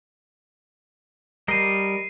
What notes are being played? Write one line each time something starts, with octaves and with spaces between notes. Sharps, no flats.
G3 A#4 D#5 C7 D#7